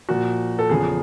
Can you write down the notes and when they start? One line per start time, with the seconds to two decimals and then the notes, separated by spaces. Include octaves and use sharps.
0.09 A#2 F3 F#4
0.59 A4
0.70 E2 C#3 F3 G#4